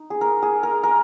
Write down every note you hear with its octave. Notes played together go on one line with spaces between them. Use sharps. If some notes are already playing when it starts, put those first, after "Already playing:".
Already playing: D#4
G#4
A#4
G#4
A#4
A#4